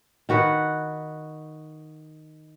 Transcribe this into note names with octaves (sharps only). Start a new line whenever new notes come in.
D#3 F#4 B4 F#5